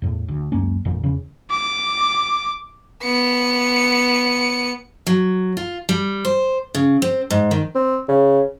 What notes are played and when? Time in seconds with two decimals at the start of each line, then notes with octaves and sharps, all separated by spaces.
0.02 E2 A2
0.28 D2
0.52 C#2 F#2 A#3 C#4
0.85 G#1 F2 A#2 E3
1.04 E2 C#3 C#4
1.50 D6
3.04 B3 C#7
5.07 F#3
5.57 F4
5.89 G3
6.25 C5
6.74 C#3
7.02 C4
7.30 G#2
7.51 D#3
7.75 C4
8.08 C#3